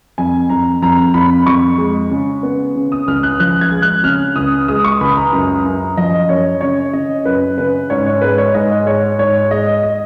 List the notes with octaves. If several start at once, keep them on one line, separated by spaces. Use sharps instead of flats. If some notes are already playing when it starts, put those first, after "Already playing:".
F2 G#5
F2 A#5
F2 A#5
F2 B5
F2 C#6
G#3
C#3
B3
C#3
D#6
C#2 F6
F#6
F3 F#6
G#6
G#3
F#6
C#3 F6
C#2 D#6
G#3 D#6
C#6
C#2 B5
A#5
F#2
F#2
F3 D#5
F#2 C#5
C#3 C#5
C#3 D#5
F#2 B4
C#3 B4
G#2 C#5
C#5
G#3 B4
C#5
G#2 D#5
G#3 C#5
G#2 C#5
G#3 D#5
D#5